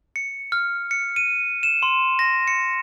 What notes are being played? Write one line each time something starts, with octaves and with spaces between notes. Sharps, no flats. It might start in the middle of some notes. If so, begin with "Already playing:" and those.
C#7
F6
C#7
D#7
E7
C6
A#6
C#7